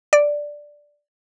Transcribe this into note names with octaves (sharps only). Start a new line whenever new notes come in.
D5